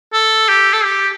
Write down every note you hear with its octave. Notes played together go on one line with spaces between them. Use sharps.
A4
G4
A4
G4